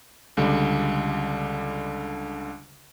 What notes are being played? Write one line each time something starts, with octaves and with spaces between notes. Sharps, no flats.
C#2 D3 G3